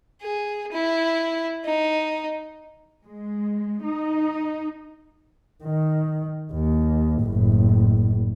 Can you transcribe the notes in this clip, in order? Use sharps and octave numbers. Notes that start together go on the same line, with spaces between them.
G#4
E4
D#4
G#3
D#4
D#3
D#2
F#1 A2